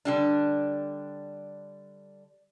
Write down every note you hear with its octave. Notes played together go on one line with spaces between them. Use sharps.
D3 G3 D4